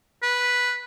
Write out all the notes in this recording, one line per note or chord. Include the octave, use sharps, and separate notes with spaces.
B4